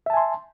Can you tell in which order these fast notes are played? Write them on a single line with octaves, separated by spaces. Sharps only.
E5 A5 G#5 C6